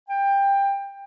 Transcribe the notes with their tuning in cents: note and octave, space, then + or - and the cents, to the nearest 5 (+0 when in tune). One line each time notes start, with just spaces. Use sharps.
G5 +20